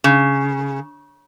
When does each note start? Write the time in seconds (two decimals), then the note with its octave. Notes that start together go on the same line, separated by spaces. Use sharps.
0.04 C#3